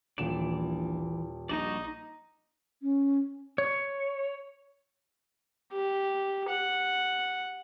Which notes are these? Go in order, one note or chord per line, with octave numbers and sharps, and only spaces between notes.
D#1 A#1 E3 D5 E7
A#1 G3 D#4 F#4 D5
C#4
C#5
G4
F#5